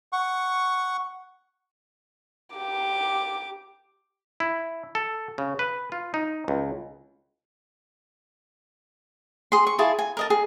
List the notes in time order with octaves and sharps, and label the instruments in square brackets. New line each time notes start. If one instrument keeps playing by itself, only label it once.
[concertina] F#5 C#6
[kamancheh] G4 D6
[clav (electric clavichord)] E4
A4
C#3
B4
F4
D#4
C#2
[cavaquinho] G#4 C6
C#6
E4 F4 G#4 A5
G#5
A#4 D#5 A5
G#4